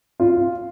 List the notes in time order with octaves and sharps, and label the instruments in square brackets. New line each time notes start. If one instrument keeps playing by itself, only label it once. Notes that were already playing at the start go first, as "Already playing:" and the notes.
[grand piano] F4